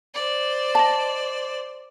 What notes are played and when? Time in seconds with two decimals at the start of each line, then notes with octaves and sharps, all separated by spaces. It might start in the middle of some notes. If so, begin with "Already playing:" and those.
0.14 C5 D5
0.75 D#5 A5